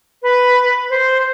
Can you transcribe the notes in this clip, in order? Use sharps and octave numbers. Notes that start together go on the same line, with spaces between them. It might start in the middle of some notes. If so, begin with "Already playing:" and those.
B4
C5